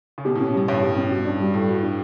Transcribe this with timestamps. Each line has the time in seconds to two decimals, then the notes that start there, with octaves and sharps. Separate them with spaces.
0.18 C#3
0.25 B2 G4
0.35 A2 C#4
0.47 B2
0.54 A2 G3
0.68 G2 C#5
0.82 G4
0.96 C#4
1.11 F#4
1.25 D4
1.40 G3
1.54 A2 A4
1.69 F#4
1.83 D4